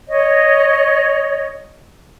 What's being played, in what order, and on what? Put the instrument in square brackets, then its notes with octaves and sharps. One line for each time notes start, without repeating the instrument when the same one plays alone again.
[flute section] C#5 D#5